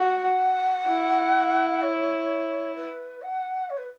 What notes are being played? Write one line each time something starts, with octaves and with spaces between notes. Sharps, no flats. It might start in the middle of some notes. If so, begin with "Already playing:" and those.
Already playing: F#4 F#5
E4
C#5
B4
F#5
C#5
B4